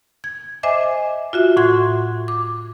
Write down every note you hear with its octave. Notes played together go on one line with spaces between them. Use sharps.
G#6
C5 D#5 E5 G#5 D6
F4 F#4 E5
A2 F#4 F#5 C6 G#6
D6